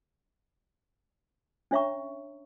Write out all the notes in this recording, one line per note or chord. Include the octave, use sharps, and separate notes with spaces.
C#4 D4 C#5 E5 A#5 C#6